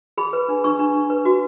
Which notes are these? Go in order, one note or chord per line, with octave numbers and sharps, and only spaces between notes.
G#4 B5
B4
D4
D4 C#6
D4
D4
B4
F#4